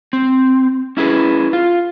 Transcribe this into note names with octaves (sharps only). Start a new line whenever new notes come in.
C4
C#4 E4 G#4 B4
F4